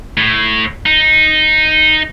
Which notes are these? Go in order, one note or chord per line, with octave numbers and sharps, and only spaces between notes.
A2
D#4